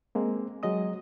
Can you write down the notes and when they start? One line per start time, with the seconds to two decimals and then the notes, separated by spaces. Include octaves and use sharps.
0.15 G#3 A#3 C4
0.63 F#3 G#3 D#5 D#6